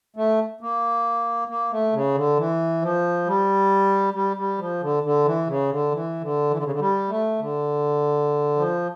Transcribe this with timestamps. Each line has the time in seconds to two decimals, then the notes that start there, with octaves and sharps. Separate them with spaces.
0.16 A3
0.61 A#3
1.48 A#3
1.71 A3
1.93 C#3
2.15 D3
2.37 E3
2.82 F3
3.26 G3
4.14 G3
4.37 G3
4.58 F3
4.81 D3
5.03 D3
5.25 E3
5.47 C#3
5.70 D3
5.91 E3
6.21 D3
6.51 E3
6.57 D3
6.64 C#3
6.71 D3
6.79 G3
7.09 A3
7.39 D3
8.57 F3